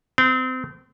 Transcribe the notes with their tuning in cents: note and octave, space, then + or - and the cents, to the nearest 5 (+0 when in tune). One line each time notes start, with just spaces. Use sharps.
C4 -30